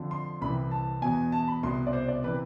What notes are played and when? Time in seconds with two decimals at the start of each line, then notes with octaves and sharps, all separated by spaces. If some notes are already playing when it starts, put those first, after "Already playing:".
Already playing: F2 D3 F3
0.11 C6
0.41 C2 C3 E3 B5
0.71 A5
1.02 E2 B2 G#5
1.32 A5
1.48 B5
1.63 C2 B2 C6
1.87 D5
1.93 C5
2.08 D5
2.24 C3 E3 B4